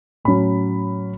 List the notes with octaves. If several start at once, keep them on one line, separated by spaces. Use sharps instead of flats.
A2 F#3 C#4 B5